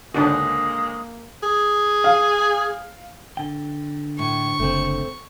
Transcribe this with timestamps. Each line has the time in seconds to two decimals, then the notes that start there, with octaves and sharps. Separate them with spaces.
0.14 C#2 G#2 D3 G#3 A#3 D4 D#4 F#4
1.43 G#4
2.04 F5
3.37 D3 G5
4.19 A2 C#6
4.60 F#1 A3 C4